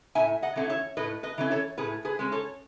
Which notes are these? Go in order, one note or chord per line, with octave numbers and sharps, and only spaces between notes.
A2 E5 G#5
D#5 F#5
E3 A3 C#4
C#5 E5
A2 B4 D#5
B4 D#5
E3 A3 C#4
A4 C#5
A2 G#4 B4
G#4 B4
G#3 C#4
A4 C#5